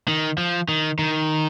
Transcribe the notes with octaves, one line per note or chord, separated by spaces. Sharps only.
D#3
F3
D#3
D#3